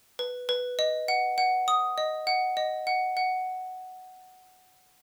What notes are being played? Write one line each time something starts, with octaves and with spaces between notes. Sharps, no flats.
B4
B4
D#5
F#5
F#5
D#6
D#5
F#5
D#5
F#5
F#5